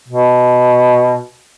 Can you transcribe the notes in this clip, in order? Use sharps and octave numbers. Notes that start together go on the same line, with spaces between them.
B2